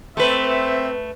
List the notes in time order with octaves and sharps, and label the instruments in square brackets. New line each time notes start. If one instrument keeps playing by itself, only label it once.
[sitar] A3 B4 [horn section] C4 E5